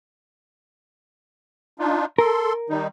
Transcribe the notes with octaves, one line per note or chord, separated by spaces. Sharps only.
D4 D#4 F4
A4 A#4 C6
D#3 G3 D#4